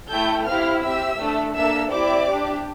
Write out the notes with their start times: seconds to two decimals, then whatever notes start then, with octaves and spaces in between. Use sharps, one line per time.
0.11 A3 E4 A4 G5 G6
0.47 C4 E4 G4 F5 F6
0.83 C4 G4 E5 E6
1.19 A3 D4 A4
1.55 A#3 D4 A4 E5 E6
1.91 C4 E4 G4 D5 D6
2.27 D4 G4